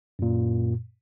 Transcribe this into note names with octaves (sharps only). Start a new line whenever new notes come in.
F#2 A#2